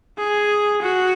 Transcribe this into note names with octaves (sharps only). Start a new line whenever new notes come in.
G#4
F#4